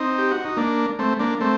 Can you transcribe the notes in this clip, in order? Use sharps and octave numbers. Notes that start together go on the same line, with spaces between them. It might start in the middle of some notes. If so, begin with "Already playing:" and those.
Already playing: C4 D#4
G4
F#4
D#4
A#3 D4
A3 C4
A#3 D4
A3 C4